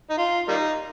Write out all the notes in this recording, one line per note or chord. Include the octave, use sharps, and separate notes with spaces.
D#4
F4
G3 A#3 D#4